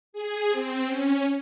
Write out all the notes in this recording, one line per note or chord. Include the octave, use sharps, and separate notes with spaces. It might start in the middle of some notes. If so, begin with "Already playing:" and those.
G#4
C4
C#4